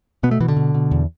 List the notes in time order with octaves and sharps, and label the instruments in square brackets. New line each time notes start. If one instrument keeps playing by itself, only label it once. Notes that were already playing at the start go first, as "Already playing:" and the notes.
[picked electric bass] B2 B3
A3
B2 E3
D3
B2
B2
E2